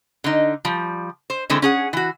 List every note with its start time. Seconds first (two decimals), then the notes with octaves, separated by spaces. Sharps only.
0.24 D3 D#4
0.65 F3 G3
1.30 C5
1.50 D3 E3 G#3 A3 C4
1.62 C#4 G#4 F#5
1.93 E3 F#4